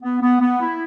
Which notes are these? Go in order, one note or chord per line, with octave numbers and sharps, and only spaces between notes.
B3
B3
B3
E4